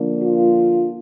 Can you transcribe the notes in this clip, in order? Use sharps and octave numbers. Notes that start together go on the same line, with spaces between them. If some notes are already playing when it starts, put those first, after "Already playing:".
Already playing: D3 F3 A#3 D4
F4